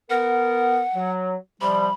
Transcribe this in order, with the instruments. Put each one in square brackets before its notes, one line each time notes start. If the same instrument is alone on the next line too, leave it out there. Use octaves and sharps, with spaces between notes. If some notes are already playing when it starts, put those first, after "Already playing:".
[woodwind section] B3 A#4 [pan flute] F#5
[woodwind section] F#3
[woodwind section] C3 F3 G3 [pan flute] B5